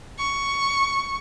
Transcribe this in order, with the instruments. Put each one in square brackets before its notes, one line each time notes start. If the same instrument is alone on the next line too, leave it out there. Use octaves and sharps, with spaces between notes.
[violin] C#6